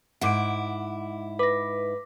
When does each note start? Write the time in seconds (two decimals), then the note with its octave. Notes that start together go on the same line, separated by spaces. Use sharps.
0.21 G#2 E4 F#5 D6 D7
1.39 B4 D6 A#6